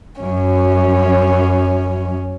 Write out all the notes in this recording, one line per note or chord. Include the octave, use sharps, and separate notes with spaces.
F#2 C#4